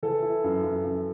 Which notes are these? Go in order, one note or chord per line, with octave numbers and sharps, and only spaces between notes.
E3 A4
E4
F#2
F#2
F#2